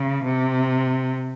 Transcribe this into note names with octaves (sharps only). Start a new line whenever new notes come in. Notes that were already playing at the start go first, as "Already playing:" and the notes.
Already playing: C#3
C3